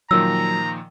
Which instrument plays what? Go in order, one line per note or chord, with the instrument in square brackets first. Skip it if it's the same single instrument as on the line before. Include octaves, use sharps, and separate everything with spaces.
[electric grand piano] A#2 D#3 F3 [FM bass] F#3 [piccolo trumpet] A#5 [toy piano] E6